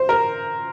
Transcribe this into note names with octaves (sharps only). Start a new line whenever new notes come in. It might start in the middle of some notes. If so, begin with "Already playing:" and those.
Already playing: C5
A#4